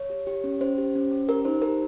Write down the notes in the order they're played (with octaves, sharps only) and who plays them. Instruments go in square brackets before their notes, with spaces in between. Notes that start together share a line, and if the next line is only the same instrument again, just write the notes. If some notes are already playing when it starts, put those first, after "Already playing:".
Already playing: [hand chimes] C#5
G4
G4
C#4
C#4 C5
G4
C#4
C#4
G4 A#4
D#4 C5
G4 A#4